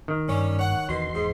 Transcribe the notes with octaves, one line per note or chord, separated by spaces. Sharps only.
D#3
G2 G3 C#4
C#5 F#5
E2 B2 C6
G#2